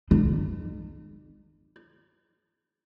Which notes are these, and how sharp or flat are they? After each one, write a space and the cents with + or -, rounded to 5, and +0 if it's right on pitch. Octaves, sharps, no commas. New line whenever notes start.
D#4 -40